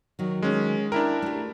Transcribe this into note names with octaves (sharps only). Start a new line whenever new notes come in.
D#3 F#3
G#3 C#4
D4 E4 A#4 G5
A3 G4